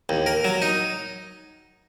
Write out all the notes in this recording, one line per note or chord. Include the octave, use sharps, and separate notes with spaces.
D#2
A#4
F#3
D#4